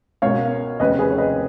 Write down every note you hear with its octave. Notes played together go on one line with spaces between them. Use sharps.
C#2 B2 A#3 C#5 F5
F1 D#2 C#3 B4 D#5
G#4 B4
C#5
B4 D#5